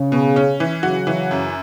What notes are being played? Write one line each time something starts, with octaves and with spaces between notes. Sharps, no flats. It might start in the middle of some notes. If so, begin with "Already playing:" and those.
Already playing: C#3
B2
C#4
E3
C#3 F#3 F#4
E3
F#2